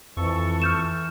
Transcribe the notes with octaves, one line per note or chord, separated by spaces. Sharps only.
F2 E3 A4 C#6
F6 G6 E7